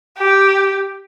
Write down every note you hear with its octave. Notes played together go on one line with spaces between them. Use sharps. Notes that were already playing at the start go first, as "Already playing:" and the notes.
G4